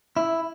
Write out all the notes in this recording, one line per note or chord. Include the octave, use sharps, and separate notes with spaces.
E4